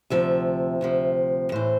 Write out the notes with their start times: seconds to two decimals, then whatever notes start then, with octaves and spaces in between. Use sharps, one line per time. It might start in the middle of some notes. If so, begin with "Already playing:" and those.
0.10 D2 C3 F3 E5
0.81 D2 C3 F3
1.52 A2 E3 C5